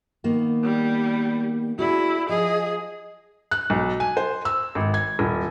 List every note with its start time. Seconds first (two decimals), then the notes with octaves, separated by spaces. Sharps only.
0.24 D#3 A#3 B3
0.64 G3
1.79 E4 F#4 G#4 D5
2.29 F3 G#4 D#5
3.51 F#6
3.70 B1
4.00 G#5
4.17 C5
4.45 E6
4.75 G#1
4.94 G#6
5.19 D#1